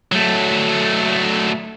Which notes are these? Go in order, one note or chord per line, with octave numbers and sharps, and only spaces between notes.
F#3 A3